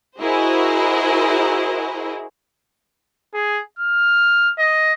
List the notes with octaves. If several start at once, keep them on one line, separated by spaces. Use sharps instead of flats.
E4 F#4 G#4 A#4 C5 D#5
G#4
F6
D#5